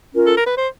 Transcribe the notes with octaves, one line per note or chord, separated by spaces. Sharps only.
C#4 F4 A#4
A4
A#4
B4
C5